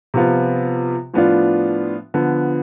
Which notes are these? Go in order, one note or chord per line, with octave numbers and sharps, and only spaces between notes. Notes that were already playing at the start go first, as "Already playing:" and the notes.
C3 F3 B3 F4
A2 F3 B3 D4 F4
D3 F3 B3